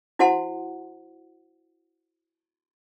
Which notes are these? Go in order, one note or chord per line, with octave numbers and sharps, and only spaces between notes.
E4 F#4 C5 F#5 A5 C6